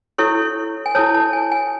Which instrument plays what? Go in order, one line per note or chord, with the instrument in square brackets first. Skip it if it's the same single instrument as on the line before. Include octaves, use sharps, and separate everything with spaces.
[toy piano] E4 A4 C#5 C#6
G#5
E4 A4 C#5 A5
A5
G#5
G#5